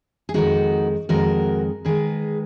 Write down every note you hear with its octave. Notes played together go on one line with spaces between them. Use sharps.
G#4
F2 D#3 G#3 D#4 F#4
F2 D#3 G#3 F#4 A#4
D#3 G#3 G#4 B4